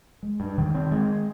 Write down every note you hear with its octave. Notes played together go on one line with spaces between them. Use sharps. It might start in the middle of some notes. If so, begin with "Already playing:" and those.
G#3
G2
D#3
C4
G#3